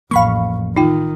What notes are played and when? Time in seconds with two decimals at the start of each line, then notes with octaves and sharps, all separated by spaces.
0.11 A1 F2 F3 A#3 F5 B5 C#6
0.76 D#3 D#4 F4 G5